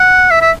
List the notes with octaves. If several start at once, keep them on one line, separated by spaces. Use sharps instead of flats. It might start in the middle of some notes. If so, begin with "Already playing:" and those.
Already playing: F#5
E5
E5